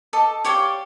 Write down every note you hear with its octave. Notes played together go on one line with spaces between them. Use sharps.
A4 D#5 D6
G4 C#5 D5 F5